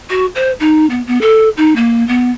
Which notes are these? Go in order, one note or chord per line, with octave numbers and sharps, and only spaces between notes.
F#4
C5
D#4
B3
B3
A4
D#4
A#3
B3